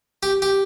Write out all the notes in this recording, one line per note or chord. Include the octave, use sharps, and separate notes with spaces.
G4
G4